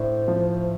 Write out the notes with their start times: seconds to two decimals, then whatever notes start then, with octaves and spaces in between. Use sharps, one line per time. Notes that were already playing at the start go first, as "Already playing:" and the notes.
Already playing: A2 D4 C5
0.28 F3